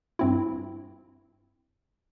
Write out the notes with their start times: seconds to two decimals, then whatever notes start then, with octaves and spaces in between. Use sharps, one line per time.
0.19 G2 C4 E4